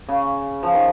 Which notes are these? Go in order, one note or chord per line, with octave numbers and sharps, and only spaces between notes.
C#3
F3
D#3